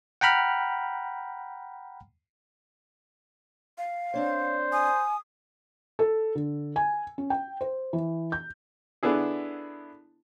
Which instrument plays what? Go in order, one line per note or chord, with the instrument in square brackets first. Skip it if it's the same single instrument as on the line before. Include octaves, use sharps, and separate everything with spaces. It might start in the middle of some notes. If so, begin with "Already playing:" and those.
[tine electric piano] F#5 G5 A#5 B5 F6
[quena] F5
[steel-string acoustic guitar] C4 D4 C#5 [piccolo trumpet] C5
[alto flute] G#5 [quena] D#6
[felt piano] A4
D3
G#5
C#4
G5
C5
E3
G6
[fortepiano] D3 B3 D4 E4 G#4